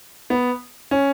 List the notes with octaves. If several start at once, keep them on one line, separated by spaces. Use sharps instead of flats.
B3
C#4